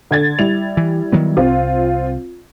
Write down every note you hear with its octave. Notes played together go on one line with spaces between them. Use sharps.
D3 G#6 A6
G3 E4 F7
E3
D#3 F#3 B3
C2 C4 F4